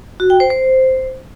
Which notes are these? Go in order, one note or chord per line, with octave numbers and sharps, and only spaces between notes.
F#4
G5
C5
C5